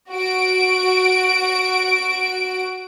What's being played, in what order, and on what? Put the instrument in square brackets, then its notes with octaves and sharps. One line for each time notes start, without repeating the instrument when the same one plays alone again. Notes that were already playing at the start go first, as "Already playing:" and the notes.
[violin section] F#4 D7